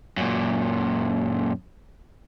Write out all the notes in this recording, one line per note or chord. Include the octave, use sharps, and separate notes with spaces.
F#2 A#2